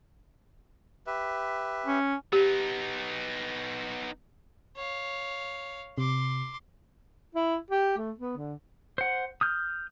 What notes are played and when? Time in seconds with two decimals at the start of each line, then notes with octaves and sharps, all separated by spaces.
1.07 G4 B4 E5
1.86 C#4
2.33 B3 D#4 G4
4.76 C#5 F5
5.98 C3 C6 D6
7.35 E4
7.70 G4
7.98 A3
8.18 B3
8.37 D3
8.98 C5 F#5
9.41 D#6 F6 G6